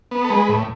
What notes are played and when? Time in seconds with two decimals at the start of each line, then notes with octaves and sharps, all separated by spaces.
0.11 B3
0.25 A4
0.30 G#3 B4
0.49 A2